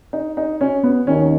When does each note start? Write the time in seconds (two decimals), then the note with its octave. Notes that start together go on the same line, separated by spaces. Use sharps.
0.13 D#4
0.37 D#4
0.61 C#4
0.83 B3
1.07 D#2 D#3 C#4